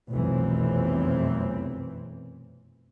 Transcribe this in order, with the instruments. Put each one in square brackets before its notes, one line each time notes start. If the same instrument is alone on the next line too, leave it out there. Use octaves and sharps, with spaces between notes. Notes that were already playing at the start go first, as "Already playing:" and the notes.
[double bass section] F1 B1 F#2 E3 C4